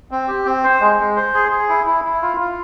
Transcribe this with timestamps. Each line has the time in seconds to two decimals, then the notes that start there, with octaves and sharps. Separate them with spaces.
0.11 C4
0.28 G4
0.45 C4
0.64 C5
0.81 G#3
1.00 G#3
1.16 C5
1.34 G#4
1.52 G#4
1.69 E4
1.86 E4
2.04 E4
2.22 F4
2.40 F4